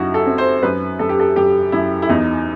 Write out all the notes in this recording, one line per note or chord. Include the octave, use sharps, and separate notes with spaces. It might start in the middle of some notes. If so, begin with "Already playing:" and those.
Already playing: F#2 D#4 E4 F#4
A4
C4
C5
F#2 B4
F#2 A4
G4
A4
F#2 G4
F#2 E4
E4
E2 D#4